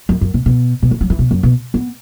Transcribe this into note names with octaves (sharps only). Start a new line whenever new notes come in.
F#2
F#2
B2
B2
B2
E3
F#3
E3
B2
F#2
B2
B3